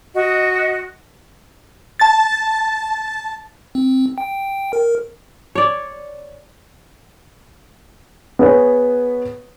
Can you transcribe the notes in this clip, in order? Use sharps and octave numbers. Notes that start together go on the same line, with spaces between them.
F#4 D#5
A5 A6
C4
G5
A#4
C#5 D5
B3 G#4 B4 C#5